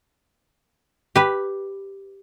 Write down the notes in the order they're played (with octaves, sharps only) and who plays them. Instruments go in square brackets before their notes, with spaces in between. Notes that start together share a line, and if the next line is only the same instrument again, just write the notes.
[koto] G4 B4